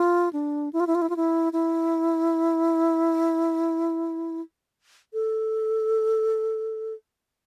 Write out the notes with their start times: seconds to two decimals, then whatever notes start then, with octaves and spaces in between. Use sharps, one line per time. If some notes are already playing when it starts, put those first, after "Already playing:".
Already playing: F4
0.33 D4
0.73 E4
0.80 F4
0.87 E4
0.95 F4
1.02 E4
1.10 F4
1.16 E4
1.53 E4
5.13 A4